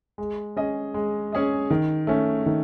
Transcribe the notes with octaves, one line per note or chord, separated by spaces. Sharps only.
G#3
C#4 G#4 D#5
G#3
C#4 G#4 D#5
D#3
A3 C#4
D#3